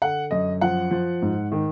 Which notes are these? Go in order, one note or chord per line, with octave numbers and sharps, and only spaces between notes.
D3 F#5
F#2 D#5
F3 F#5
F3
G#2
D#3